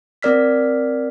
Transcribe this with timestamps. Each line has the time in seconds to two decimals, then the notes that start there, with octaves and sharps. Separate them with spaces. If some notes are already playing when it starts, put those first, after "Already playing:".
0.23 C4 A#4 D5 F6 B6